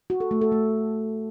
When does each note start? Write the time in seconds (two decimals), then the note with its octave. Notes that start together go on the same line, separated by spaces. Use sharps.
0.10 F#4
0.20 A4
0.31 A3
0.41 A4
0.52 A3